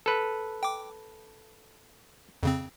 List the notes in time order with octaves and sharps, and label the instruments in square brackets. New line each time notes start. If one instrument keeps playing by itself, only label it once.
[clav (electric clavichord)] A4 B4
[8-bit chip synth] G5 D6
F2 C#3 C4